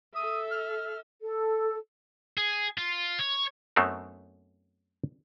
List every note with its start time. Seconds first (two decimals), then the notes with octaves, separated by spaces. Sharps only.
0.15 A4 E5 D#6
0.50 F6
1.22 A4
2.38 G#4
2.78 F4
3.19 C#5
3.76 F#2 F#3 A3 B3 C4 D#4